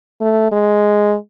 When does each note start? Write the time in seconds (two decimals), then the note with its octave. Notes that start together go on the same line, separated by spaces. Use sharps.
0.21 A3
0.52 G#3